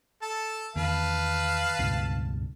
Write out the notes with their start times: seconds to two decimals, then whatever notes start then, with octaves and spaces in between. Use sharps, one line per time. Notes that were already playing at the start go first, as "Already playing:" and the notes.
0.22 A4 A5
0.76 E2 D#3 B4 F5 A5
1.79 C#2 G2 B2